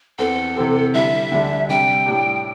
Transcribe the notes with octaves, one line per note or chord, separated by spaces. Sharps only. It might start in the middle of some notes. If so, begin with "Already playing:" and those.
E2 E3 C4 A4
C3 E3 C4 G4
D3 G3 E4 E5
D2 D3 G3 D4 A4
C3 G3 D4 G5
A2 G3 D4 G4